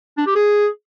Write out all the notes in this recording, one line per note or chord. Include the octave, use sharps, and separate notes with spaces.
D4
G4
G#4